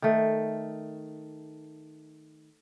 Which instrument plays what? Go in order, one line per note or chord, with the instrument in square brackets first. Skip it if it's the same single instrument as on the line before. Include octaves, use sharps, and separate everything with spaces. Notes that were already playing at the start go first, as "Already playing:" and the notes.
[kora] D#3 A3